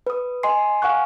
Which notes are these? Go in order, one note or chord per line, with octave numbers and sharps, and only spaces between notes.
B4 D#6
D#5 G#5 C6 C7
F5 F#5 G#5 C#6 F#6